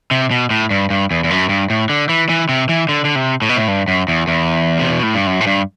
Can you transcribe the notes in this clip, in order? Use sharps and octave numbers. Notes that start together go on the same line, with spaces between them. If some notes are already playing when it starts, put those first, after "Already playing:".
C3
B2
A2
G2
G2
E2
E2
F#2
G2
A2
D3
E3
E3
C3
E3
D3
D3
C3
A2
B2
A2
G2
F#2
E2
E2
C3
B2
A2
G2
F#2
A2
G2